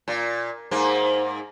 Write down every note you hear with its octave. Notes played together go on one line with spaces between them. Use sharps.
A#2
G#2 A#3